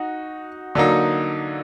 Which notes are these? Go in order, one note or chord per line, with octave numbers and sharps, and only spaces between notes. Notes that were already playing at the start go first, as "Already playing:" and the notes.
Already playing: D#4 F#4
D3 F#3 A#3 D#4